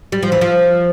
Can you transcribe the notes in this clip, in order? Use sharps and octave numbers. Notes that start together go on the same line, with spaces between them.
G3
F3
E3
F3